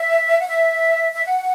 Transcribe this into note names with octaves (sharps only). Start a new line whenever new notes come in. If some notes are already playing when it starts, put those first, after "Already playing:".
Already playing: E5
F#5
E5
E5
F#5